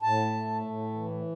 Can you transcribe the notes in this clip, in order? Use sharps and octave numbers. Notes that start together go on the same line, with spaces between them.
A2 A5
A3
A2
E3